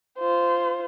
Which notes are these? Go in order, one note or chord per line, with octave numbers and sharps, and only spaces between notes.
F4 C5